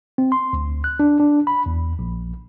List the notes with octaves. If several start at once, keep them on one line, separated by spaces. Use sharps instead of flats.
C4
C6
D2
F#6
D4
D4
B5
E2
A#1